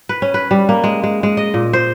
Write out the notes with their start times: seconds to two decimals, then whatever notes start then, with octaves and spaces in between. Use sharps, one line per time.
0.09 B4
0.22 C#4
0.34 B4
0.51 G3
0.69 A#3
0.84 G#3
1.03 G#3
1.23 G#3
1.37 D#5
1.54 A#2
1.73 C5